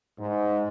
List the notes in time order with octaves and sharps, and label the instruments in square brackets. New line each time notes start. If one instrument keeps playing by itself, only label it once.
[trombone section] G#2